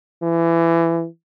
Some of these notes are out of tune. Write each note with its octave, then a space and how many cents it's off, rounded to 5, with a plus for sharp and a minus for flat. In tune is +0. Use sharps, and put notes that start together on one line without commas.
E3 +20